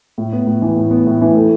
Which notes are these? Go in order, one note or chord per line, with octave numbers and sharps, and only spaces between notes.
A2
B3
A2
E3
A2
B3
A2
E3
A3